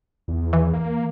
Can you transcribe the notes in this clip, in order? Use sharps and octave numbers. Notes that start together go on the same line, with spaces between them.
E2
E3
A#3